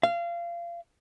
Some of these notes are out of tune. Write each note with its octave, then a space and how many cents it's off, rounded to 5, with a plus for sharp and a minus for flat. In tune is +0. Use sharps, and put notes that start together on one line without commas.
F5 -25